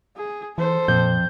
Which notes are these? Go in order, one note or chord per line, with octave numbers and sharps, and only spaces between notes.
G#4
E3 A4 C5
F2 A#2 G6